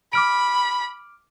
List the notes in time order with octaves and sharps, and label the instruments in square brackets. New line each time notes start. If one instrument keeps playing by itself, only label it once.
[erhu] B5 [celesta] D6 F6 D7